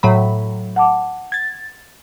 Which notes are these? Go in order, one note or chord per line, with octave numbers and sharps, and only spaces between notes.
A2 F#3 B5
F#5 A5 D6
G#6 A6